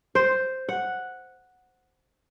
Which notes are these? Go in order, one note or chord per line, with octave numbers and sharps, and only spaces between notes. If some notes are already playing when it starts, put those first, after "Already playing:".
C5
F#5